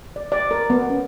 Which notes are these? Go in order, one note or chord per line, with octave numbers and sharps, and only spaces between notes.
D5
D5
A#4
B3
C#4